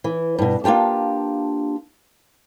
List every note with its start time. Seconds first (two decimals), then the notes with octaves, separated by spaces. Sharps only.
0.04 E3
0.39 G2 B2
0.64 A#3 D4 F4 G4 A5